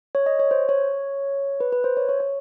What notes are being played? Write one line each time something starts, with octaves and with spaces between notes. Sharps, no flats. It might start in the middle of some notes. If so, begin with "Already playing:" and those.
C#5
D#5
C#5
C5
C#5
B4
B4
C5
C#5
C#5
C#5